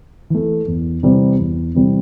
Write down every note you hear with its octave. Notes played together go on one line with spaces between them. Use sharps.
E3 A3
E2
C3 E3 G3 C4
E2
C3 E3 G3 C4